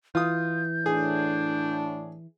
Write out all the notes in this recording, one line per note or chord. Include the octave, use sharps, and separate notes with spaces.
E3 F4 D#6 G6
A2 D4 G#4